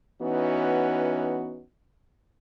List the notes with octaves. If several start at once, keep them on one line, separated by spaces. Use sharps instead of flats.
E3 B3 C#4 D#4 F#4